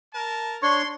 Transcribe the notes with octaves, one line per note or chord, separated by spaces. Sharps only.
A#4 A5
D4 C#5 C6 C#6